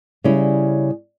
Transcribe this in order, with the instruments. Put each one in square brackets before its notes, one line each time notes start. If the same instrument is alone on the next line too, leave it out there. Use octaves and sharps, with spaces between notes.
[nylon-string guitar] C#3 G3 C#4 E4